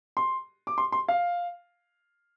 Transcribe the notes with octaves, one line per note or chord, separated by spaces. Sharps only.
C6
D6
C6
C6
F5